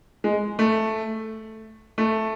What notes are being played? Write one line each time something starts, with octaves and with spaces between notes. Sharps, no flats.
G#3
A3
A3